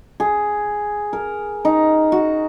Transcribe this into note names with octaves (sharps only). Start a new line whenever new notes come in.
G#4
A#4
D#4
F#4